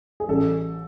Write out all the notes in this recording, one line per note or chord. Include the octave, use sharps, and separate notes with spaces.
G#4
A1 A4